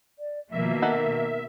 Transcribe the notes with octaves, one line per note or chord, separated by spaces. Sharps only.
D5
B2 D#3 F3 A#3 E5
D#4 A4 A#4 F#5